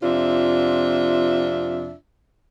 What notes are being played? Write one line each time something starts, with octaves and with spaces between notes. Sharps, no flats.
F2 C3 D4 F4 E5